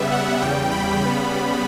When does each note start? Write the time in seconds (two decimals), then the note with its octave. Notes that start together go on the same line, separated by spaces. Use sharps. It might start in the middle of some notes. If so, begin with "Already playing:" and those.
Already playing: C#3 G3 B3 E5
0.11 F#5
0.41 E2 C#3 G3 G5
0.71 B5
1.01 C#3 G3 B3 B5